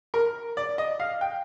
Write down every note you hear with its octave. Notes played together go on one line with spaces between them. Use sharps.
A#4
D5
D#5
F5
G5